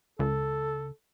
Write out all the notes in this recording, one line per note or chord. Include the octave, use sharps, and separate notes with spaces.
C#2 A4